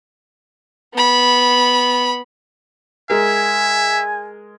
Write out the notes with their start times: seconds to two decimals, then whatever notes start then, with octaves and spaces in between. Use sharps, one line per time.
0.94 B3 B5
3.10 G#3 G#4 A#4 E5 G#5